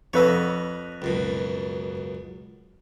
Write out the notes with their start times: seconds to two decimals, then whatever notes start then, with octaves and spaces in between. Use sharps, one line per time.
0.13 F2 B4 C#5 D#5 E6
1.02 C#2 F#2 B2